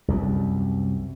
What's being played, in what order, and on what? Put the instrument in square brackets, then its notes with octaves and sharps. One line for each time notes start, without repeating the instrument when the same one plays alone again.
[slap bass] C2 F#2